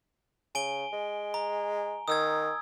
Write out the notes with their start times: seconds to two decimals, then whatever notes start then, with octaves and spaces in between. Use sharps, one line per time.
0.55 C#3 G#5 D7 G7
0.93 G#3
1.34 A#5
2.08 D#3 D#6 E6 G#6